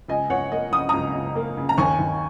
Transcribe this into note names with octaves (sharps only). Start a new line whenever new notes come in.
C#2 D#5 G#5
C#2 C#5 F#5
A#3 D#5
C#3 D#6
C#2 A#5 D#6
C#2
A#3
C#3
A#5
D#2 G#5 C#6
D#2